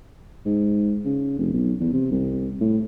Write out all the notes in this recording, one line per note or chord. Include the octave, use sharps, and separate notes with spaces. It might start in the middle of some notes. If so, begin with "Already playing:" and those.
G#2
C#3
F1
B1
E2
C3
C2
A2